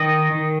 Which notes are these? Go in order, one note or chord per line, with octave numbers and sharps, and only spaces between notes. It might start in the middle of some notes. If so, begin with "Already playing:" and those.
Already playing: D#3 D#5
D#3